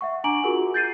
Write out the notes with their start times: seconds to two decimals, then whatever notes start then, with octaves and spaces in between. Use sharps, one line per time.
0.01 E5 F#5 C#6
0.24 D4 G#5 A#5 D6 D7 F#7
0.44 F4 F#4 G#4 A#4 F#5
0.74 G6 A6 C7 D#7